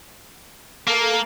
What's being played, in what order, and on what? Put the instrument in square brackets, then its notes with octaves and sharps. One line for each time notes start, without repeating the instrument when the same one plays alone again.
[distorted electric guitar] A#3 [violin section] A4 A#4 F5